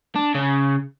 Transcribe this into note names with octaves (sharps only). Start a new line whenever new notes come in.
D4
C#3